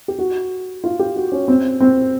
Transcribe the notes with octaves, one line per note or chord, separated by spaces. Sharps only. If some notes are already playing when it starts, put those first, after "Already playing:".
G4
F#4
F4
G4
F#4
C#4
C4
C4